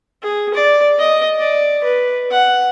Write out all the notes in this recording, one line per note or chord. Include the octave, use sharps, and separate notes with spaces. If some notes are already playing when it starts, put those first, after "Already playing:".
G#4
D5
D#5
D5
B4
F#5